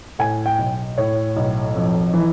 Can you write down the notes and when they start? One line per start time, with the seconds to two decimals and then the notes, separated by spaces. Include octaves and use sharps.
0.19 A2 G#5
0.46 G5
0.59 B1
0.98 A2 C#5
1.36 B1
1.76 F2
2.14 E3